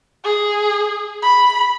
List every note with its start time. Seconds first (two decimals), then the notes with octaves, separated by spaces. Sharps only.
0.24 G#4
1.22 B5